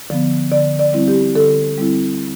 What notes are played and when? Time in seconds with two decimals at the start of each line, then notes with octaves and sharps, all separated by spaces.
0.10 D3 F3 B3
0.51 D3 D5
0.79 D5
0.93 G3 C4 E4
1.08 G4
1.35 D3 A4
1.78 G3 C4 E4